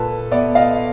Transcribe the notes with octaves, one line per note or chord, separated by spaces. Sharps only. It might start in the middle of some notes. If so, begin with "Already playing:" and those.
Already playing: A#2 A4 B4
B3 D5 E5
D#5 F5